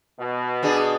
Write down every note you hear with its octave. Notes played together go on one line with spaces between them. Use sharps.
B2
B3 D4 G#4